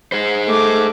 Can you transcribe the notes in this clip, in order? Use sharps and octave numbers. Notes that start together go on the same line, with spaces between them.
G#4 C5
A3 D6